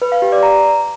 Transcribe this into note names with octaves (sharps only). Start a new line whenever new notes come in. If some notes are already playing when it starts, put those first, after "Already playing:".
B4
F5
G4
D5
A#5